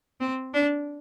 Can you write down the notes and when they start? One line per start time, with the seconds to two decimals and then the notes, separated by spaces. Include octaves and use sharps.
0.20 C4
0.54 D4